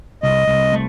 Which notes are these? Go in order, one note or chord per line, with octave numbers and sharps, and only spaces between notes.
C2 D#5
C2
A3